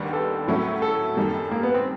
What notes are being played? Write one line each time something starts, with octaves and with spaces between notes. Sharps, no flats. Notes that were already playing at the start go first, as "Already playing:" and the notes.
Already playing: D#2 D#3 G3 B3 D4
A4
A2 F#3 A3 C#4 E4
A4
F#2 D#3 G3 A#3
A#3
B3
C4